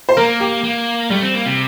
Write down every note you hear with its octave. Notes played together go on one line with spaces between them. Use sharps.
C5
A#3 A#4
G4
A#3
G3 A3
C4
A#3
C3